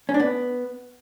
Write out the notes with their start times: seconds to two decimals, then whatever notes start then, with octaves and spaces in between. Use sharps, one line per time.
0.09 C#4
0.14 D4
0.20 B3